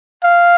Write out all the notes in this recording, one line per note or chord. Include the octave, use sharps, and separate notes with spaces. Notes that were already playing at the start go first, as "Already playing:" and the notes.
F5